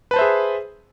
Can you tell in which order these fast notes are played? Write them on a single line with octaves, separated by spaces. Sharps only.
B4 A5 C5 E5 G#4